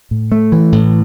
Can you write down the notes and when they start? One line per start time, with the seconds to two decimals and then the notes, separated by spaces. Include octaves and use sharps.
0.11 A2
0.32 A3
0.52 E3
0.72 A2